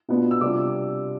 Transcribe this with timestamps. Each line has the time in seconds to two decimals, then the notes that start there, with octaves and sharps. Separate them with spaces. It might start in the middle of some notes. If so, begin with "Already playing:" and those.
0.09 B2 B3 D4 F4
0.31 E6
0.41 C3 G3 D4 F4 D6